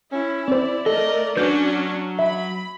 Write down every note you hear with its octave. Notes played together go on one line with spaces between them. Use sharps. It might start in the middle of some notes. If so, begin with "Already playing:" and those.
C#4 E4
C4 C5 D5
A3 A4 A#4 D#5
F#3 C#4 D4 F#4 B4 G6
E5 B5